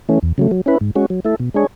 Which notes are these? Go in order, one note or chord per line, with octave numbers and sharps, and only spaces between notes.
E3 A3 C#4
E2
C#3 F#3 A3
F#3
C#4 E4 B4
G#2
G#3 C#4 F#4
F#3
A3 E4 A4
B2
G#3 D4 G#4 C#5